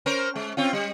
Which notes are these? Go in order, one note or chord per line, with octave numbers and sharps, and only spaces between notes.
C#4 A#4 C5
G#3
C4 C#4 F4
G3